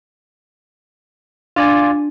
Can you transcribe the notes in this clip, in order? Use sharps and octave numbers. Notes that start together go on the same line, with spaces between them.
D4 F4 D5 G#5